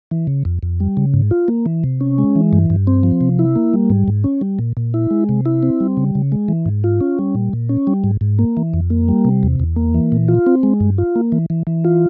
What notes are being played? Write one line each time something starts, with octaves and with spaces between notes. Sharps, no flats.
E3
C#3
F2
F2
G3
C#3
G#2
F4
A#3
E3
C3
C#4
G#3
E3
G2
G2
C4
F3
C3
E4
A#3
G3
G#2
G#2
C#4
G3
A#2
A#2
E4
G#3
C3
E4
C4
G3
C#3
C#3
G#3
E3
G#2
F4
C#4
G3
A#2
A#2
C#4
G3
G#2
G#2
A#3
E3
F2
A#3
G3
C3
E2
E2
A#3
E3
A#2
F4
C4
G#3
G2
F4
A#3
E3
E3
E3
F4